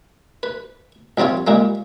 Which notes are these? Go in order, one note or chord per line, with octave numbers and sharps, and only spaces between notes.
B4
A#1 G3 C4 F4 C#5
A#2 G3 G#3 A#3